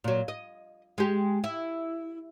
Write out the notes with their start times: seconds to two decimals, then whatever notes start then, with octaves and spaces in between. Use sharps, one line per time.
0.04 A#2 F#3
0.28 D#5
0.98 G#3 G4
1.44 E4